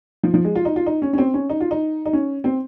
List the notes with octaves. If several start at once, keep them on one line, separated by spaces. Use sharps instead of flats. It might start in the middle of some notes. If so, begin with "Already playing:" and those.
F3
F3
G#3
F4
D#4
F4
D#4
C#4
C#4
C4
C#4
D#4
F4
D#4
D#4
C#4
C4